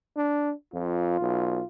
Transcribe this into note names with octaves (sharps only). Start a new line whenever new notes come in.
D4
F2 F4
B1